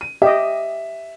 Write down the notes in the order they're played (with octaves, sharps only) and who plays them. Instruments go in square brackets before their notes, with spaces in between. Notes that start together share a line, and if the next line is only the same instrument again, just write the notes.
[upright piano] D#7
[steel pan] G4 D#5 [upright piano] E5